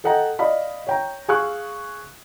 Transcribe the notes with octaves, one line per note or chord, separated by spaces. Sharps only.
A4 D#5 F#5 G5 A#5
D5 D#5 F5 B5
C#5 G5 A#5
G#4 F5 G#5 C#6 E6 F#6